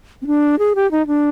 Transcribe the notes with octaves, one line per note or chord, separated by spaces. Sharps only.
C4
D4
G#4
G4
D#4
D4